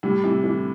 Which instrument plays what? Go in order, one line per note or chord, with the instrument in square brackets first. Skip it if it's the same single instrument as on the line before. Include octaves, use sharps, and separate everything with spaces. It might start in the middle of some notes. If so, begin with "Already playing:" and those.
[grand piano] A2 [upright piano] G3
[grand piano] C3 [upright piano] E3
[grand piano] D3 [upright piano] E3